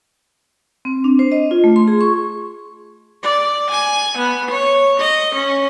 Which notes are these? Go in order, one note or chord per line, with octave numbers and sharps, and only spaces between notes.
C4
D4
C5
D#5
F4
A3
C6
G#4
C#6
D5
G#5
B3
C#5
D#5
C#4